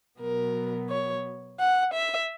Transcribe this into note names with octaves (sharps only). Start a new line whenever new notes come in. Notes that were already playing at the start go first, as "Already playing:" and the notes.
B2 F#3 B3 A#4
C#5
F#5
E5